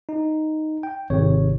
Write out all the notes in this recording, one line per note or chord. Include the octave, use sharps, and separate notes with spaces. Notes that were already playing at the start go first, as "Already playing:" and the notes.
D#4
G5
G#1 C3 C#5